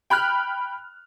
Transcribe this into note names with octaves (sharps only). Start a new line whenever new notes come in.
G5 B5 F6 F#6